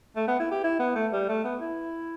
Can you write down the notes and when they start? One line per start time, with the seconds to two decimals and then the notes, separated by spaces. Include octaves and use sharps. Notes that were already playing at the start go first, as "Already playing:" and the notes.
0.16 A3
0.28 B3
0.40 E4
0.51 G4
0.64 E4
0.79 B3
0.95 A3
1.13 G3
1.29 A3
1.44 B3
1.61 E4